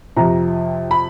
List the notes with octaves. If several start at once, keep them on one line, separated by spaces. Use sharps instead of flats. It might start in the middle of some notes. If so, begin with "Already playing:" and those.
F2 C3 F3 A#5
B5